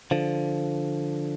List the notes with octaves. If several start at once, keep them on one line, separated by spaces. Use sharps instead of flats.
D3 F3